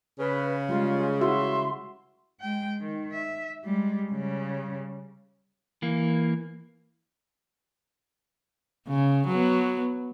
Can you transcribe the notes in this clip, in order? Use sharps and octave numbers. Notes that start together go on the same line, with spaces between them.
C#3 B4
G3 G#3 F4
E4 F#4 E5 C6
G#3 G5
D#3
E5
G3 G#3
C#3 G3
E3 A#3
C#3
F#3 B3